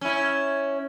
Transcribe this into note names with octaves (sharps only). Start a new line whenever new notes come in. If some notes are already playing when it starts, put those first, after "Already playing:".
C#4 E4